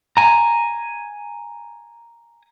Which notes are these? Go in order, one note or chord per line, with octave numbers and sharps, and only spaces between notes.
G#5 A#5